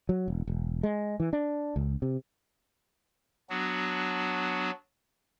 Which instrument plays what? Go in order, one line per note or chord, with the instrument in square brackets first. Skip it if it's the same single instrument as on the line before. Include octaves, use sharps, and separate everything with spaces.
[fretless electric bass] F#3
E1
E1
G#3
E3
D4
C#2
C3
[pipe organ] F#3 B3 D4 F#4